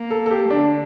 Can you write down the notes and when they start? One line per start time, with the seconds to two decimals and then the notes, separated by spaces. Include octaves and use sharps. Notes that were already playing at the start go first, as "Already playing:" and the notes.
Already playing: A#3
0.11 A4
0.26 A4
0.31 G4
0.50 D3 D4